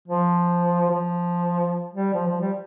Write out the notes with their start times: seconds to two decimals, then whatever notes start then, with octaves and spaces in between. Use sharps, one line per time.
0.08 F3
0.91 F3
1.93 G3
2.14 F3
2.27 F3
2.41 G3